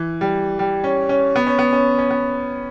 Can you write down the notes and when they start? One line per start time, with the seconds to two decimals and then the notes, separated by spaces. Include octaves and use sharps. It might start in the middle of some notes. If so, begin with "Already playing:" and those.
Already playing: E3
0.21 G3
0.59 G3
0.84 C#4
1.09 C#4
1.36 B3
1.47 C#4
1.59 B3
1.73 C#4
1.98 C#4
2.10 B3